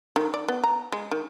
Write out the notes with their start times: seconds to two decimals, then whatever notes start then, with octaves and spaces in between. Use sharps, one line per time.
0.16 D#3
0.34 D5
0.48 B3
0.63 A#5
0.92 G#3
1.11 D#3